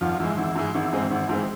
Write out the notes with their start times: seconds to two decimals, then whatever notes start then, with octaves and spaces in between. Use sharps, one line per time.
0.01 G#1 F2 F3
0.20 G#2 E3 G#3
0.37 G#1 E3
0.55 G#2 G#3
0.74 G#1 E3
0.93 G#2 G#3 C4
1.11 G#1 E3
1.29 G#2 G#3 C4